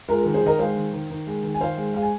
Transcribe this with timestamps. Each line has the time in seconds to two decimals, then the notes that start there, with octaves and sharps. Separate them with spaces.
0.08 G#3 F4 A#4
0.21 D#3 F4 A#4
0.34 G#4 C5
0.42 D#3 A#4 D#5
0.58 G#3 C5 F5
0.76 D#3
0.93 D#3
1.10 D#3
1.27 G#3
1.43 D#3
1.54 G#5
1.60 D#3 C5 F5
1.77 G#3
1.94 G#3 F5
2.02 G#5